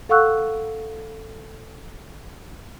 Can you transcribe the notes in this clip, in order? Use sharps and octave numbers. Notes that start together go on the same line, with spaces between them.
A4 F5 F#5 C#6 E6 F#6